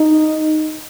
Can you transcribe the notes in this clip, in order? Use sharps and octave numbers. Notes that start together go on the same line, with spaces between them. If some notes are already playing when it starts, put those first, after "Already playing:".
Already playing: D#4